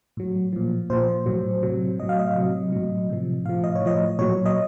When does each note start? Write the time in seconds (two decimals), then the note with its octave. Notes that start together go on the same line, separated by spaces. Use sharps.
0.17 A2 F#3
0.53 A#2 F3
0.90 A#2 F3 C5
1.26 A2 F#3
1.63 C3 F#3
1.99 A2 F#3 D#5
2.09 F5
2.19 D#5
2.36 C3 F#3
2.72 A2 F#3
3.10 C3 F3
3.46 A2 F3 F5
3.64 D#5
3.75 C#5
3.82 A2 F3 D#5
4.19 A#2 F#3 C#5
4.46 D#5